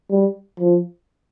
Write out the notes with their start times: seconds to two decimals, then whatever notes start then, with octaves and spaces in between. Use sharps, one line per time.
0.11 G3
0.60 F3